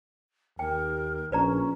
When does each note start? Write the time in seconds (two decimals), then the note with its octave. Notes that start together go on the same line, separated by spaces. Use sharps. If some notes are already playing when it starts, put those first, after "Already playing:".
0.59 D#2 A#4 G5
1.32 A#1 C#4 B4 D5 A#5